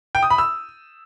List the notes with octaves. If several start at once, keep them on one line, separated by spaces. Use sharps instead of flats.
G5
D#6
B5
E6